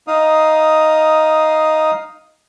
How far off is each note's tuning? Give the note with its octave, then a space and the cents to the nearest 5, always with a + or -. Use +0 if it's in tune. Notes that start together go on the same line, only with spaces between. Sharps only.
D#4 +5 F5 +0 D#6 +0